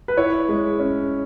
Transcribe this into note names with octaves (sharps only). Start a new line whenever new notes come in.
B4
E4 C#5
G#3
C#4